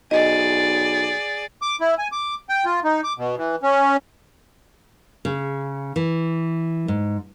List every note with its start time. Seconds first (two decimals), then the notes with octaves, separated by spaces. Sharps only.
0.11 B1 G#4 D5 D#5
1.62 D6
1.81 E4
1.98 G#5
2.12 D6
2.49 G5
2.65 F4
2.84 D#4
3.04 D6
3.18 B2
3.38 E3
3.63 C#4
5.25 C#3
5.96 E3
6.88 G#2